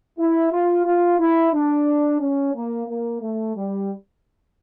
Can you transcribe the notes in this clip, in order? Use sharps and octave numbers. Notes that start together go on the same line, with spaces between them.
E4
F4
F4
E4
D4
C#4
A#3
A#3
A3
G3